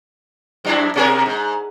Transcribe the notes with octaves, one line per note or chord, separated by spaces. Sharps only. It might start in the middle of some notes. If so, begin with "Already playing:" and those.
F#2 D4 E4
B2 G#4 A#4
G#2